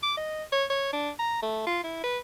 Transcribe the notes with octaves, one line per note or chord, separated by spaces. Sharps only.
D6
D#5
C#5
C#5
D4
A#5
A3
F4
E4
B4